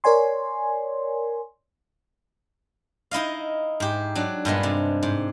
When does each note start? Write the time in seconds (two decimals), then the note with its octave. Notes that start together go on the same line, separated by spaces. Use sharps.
0.04 A#4 C#5 D5 G#5 C6
3.11 D#4 E4 D#5 F5
3.80 G#2 G4
4.15 F#3 D4
4.45 G2 A#2 G#3 B3
4.63 C3
5.03 G#2